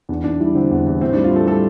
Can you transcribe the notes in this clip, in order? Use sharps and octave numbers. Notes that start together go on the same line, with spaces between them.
E2 D4
E2 D4
G3 E4
D3 C4
E2
E2
A2 C4
G3 D4
F4
A2 A4
G3 A4